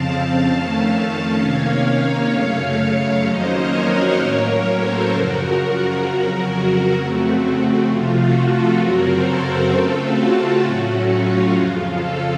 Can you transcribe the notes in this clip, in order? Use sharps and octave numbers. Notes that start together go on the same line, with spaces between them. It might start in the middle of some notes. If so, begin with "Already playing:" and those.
Already playing: F2 C#3 F3 C4 F5 A5
F2 D#3 A3 C#4
C3 D#3 A#3 C#4 C#5 F5
F#2 C#3 A3 C#4
F2 D#3 F#3 A#3 C#4 C5 D#5
A#4 C#5
F#4 A#4
A2 F#3 A#3 C#4 A#4 C#5
A4 C5
F#2 C#3 F3 F#4 A#4
F2 C#3 F#3
F2 C#3 A3 C4 F#4
C3 F3 A3 F4
F#4
F4 A4
F#2 C#3 F#3 C4 F#4 A#4
A4 C5
F#4 A#4
C#3 A3 C4 F4 A4
F#4
F4
A2 F#3 A3 C#4 F#4
F4
F2 C#3 F3 F4
F4 A4